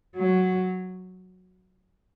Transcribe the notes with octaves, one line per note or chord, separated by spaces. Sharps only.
F#3